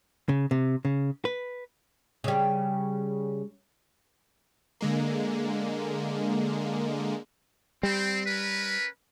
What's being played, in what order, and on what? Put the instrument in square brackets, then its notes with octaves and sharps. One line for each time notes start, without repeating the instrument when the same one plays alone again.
[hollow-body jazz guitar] C#3
C3
C#3
B4
[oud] C#3 G3
[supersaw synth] D3 G#3 A#3
[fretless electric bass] G3 [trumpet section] C4
[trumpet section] C#4 A#4 B4